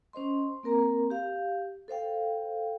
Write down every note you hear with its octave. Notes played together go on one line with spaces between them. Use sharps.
C#4 C5 D#5 C6
A#3 C4 A#4 A#5
G4 F5
A4 C5 F5 G5